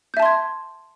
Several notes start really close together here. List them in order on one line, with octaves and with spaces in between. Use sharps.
G6 E5 A5 C6 G#6